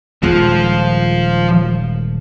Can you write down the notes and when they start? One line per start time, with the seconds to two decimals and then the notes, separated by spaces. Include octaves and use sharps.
0.23 D#1 D#2 F3 G#3